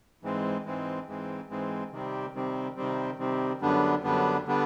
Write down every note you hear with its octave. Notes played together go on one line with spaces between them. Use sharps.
G#2 E3 G#3 C4
G#2 E3 G#3 C4
G#2 E3 G#3 C4
G#2 E3 G#3 C4
C3 D#3 G3 C4
C3 D#3 G3 C4
C3 D#3 G3 C4
C3 D#3 G3 C4
F#2 D3 G3 B3 D4
F#2 D3 G3 B3 D4
D3 G3 B3 D4